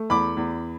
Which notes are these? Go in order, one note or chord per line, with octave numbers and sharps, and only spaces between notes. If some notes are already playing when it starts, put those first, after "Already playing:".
Already playing: A3
E2 B5 D6
E2